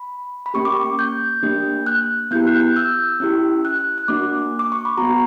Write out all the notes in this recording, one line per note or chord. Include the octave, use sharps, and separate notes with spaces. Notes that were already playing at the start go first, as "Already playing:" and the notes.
Already playing: B5
B5
A#3 C#4 G4 C#6
D6
G6
A#3 D4 G4
F#6
B3 E4 G4 G6
F#6
G6
E6
C#4 E4 G4
F#6
F#6
F#6
A#3 D4 F#4 D6
D6
C#6
B5
B3 F#4 A#5